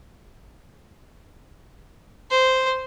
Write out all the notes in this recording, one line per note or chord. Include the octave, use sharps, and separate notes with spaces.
C5